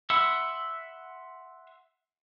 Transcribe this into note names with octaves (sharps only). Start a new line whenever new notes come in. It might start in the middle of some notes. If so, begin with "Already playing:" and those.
E5 F#5 B5 C6 E6